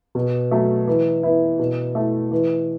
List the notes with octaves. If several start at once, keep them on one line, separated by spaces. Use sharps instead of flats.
B2
F#3 A3
E3
B3 E4
B2
A3 E4
E3